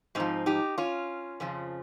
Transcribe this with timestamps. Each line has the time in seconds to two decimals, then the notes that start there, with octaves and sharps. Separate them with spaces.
0.15 G#2 F3 C4 D#4
0.46 D#4 G4
0.78 C#4 F4
1.40 F2 C#3 F3